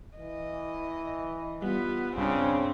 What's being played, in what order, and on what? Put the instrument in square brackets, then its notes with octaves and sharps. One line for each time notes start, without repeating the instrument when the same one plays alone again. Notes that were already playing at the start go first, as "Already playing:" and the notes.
[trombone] E3 [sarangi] D#5
[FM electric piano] G3 [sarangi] B3 [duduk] F4
[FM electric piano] B1 G2 B5 [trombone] C#3 [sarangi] C4 [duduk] D4